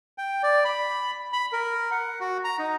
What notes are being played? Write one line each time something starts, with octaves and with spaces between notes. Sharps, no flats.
G5
D5
B5
B5
A#4
F#5
F#4
A#5
D#4